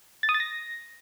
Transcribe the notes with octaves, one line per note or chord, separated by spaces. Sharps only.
A6
D#6
A6
A#6